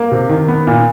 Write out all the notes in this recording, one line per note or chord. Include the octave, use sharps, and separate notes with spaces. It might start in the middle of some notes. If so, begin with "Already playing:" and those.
Already playing: A#3
C3
D#3
B3
A#2